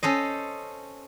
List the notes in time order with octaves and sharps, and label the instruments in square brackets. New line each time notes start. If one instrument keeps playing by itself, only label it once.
[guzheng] C#4 A4 C5 D#5